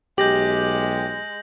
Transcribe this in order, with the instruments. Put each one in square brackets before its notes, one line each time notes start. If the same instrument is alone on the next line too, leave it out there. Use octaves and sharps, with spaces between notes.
[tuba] B1 [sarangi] G#3 [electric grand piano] G4 [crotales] G6 A#6 F#7